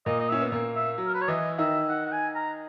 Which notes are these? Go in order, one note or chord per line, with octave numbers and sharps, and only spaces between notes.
A#2 A#3 D#5
D#5
C#4 E5
B3
A#2 A#3
E5
F#3
A#4
B4
C#5
E3 E4 D#5
D#3 D#4 E5
F#5
F#5
G#5
A#5